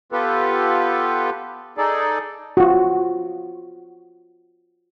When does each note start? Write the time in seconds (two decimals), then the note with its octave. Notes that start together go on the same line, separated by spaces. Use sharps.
0.12 B3 F4 G4 A4 B4
1.78 D#4 G#4 A4 D5
2.57 F4 F#4